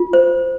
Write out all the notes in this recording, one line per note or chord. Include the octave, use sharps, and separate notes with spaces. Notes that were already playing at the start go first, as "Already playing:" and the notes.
Already playing: F4
C5